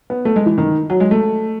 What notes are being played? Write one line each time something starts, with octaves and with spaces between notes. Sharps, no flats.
B3
A3
G#3
E3
D#3
F#3
G#3
A3